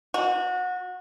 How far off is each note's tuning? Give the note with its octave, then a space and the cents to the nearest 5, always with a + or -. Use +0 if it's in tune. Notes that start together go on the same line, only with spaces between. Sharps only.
F#4 -25